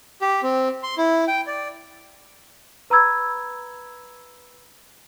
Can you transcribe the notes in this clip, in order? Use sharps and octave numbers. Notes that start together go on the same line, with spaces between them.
G4
C4
C6
E4
G5
D5
B4 A#5 B5 E6 G#6